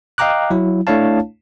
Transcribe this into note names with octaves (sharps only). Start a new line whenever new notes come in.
D#5 F5 G5 A#5 D6 F#6
F#3 E4
A3 D4 E4 C#5 F5 A5